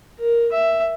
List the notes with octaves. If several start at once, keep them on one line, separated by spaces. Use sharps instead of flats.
A#4
E5